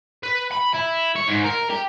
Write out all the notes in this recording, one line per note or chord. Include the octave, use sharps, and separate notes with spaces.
B4
B5
E4
C#5
G#2
A#4
G4